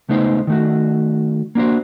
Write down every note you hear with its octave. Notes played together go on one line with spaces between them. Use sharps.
C#2 A3 B3 D#4 C5
D#3 A3 F#4
A#3 D4 F#4 C5